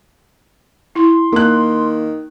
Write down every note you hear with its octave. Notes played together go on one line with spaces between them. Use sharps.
E4 C6
D#3 A#3 F#6